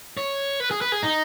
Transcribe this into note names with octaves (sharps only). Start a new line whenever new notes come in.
C#5
B4
G#4
B4
G#4
D#4